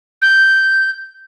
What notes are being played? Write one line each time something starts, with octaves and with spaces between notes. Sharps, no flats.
G6